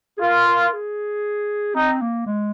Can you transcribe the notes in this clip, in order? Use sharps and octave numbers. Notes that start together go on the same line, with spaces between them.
G#4
F4 A#4
A#4
G#4
C4 D#4
A#3
G#3